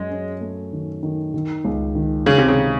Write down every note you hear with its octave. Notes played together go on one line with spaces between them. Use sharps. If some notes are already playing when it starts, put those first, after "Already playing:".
Already playing: F#2 G#3 C#4
C#4
A3
D#3
D#3
D#3
C#2
D#3
C#2 C#3
C3
C#3
C3